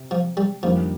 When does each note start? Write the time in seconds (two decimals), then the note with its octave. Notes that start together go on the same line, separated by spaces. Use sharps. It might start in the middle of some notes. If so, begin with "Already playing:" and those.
Already playing: C3
0.11 F3
0.37 G3
0.63 F2 D#3 F3 G3 A#3 D4